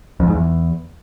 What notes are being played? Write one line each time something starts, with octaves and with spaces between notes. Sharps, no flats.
F2
G#2
E2